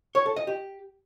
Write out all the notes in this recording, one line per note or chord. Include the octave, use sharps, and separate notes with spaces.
C#5
A4
D#5
G4